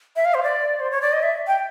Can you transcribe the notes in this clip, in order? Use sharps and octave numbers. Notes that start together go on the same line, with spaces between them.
E5
F5
C5
D5
C5
C#5
D5
D#5
E5
G5